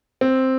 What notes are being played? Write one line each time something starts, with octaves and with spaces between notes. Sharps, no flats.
C4